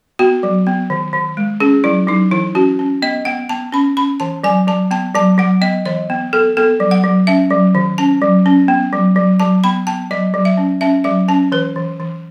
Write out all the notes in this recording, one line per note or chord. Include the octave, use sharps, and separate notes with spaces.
B3 F#4
F#3
B3
D#3
D#3
G#3
C#4 G#4
F#3 E4
F#3 D#4
E3 E4
C#4 F#4
C#4
B3 D#5
B3 F#5
B3 A5
C#4 B5
C#4 B5
E3 A5
F#3 G#5
F#3 A5
B3 A5
F#3 A5
F#3 F#5
B3 D#5
E3 D#5
B3
B3 A4
B3 A4
F#3
F#5
F#3
C#4 E5
F#3
D#3
C#4 A5
F#3
C#4
B3
F#3
F#3
F#3 A5
B3 B5
B3 A5
F#3 D#5
F#3
E5
C#4
C#4 E5
F#3 E5
C#4 A5
E3 B4
E3
E3